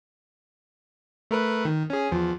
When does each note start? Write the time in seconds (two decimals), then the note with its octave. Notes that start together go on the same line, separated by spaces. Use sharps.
1.31 A3 A#4 B4
1.65 D#3
1.90 C#4 G#4
2.12 E2 F3